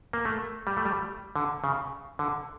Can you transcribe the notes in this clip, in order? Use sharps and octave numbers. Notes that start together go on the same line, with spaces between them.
A#3
A3
G3
A3
G3
D3
C#3
D3